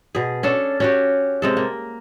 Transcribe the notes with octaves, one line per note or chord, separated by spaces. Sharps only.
B2 G#4
C#4 D4 A4
C#4 F#4 G4
C3 G#3 A4
A#3